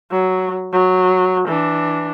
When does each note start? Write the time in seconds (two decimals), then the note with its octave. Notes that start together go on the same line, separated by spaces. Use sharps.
0.11 F#3
0.73 F#3
1.48 E3 D4